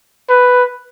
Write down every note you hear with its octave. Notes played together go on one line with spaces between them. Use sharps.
B4